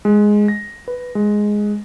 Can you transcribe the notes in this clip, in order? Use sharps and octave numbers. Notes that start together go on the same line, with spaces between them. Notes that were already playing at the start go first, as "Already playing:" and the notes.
G#3
A#6
B4
G#3